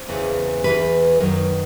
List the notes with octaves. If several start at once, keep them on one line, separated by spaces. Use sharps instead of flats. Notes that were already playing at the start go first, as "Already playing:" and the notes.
Already playing: C5
E2 C#3 E3
E2 C#3 E3 B4
F#2 D#3